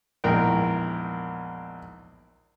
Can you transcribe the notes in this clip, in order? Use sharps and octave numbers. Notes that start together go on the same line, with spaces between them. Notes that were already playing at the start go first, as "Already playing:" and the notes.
A#1 E2 G#2 A#4 G5